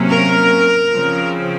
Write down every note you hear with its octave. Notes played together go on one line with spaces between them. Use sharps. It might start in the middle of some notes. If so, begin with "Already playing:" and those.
Already playing: C3 F#3 A#3 C#4
A#4
C#3 F3 C4